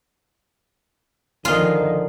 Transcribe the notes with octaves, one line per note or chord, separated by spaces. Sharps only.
D3 D#3 F3 F4 G#4 D#5